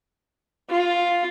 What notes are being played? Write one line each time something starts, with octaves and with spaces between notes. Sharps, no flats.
F4